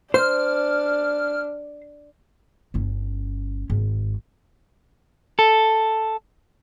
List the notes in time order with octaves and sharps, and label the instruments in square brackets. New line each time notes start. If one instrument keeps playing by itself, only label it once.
[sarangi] D4 [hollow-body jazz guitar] C5 [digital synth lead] F6
[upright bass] G1 C#4
G#1
[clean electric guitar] A4